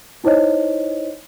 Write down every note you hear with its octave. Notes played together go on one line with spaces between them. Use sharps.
D#4 E4 C5 C#5 D#5